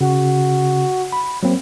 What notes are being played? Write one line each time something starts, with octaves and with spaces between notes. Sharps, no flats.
C#3 F#4
B5
F#3 A#3 C4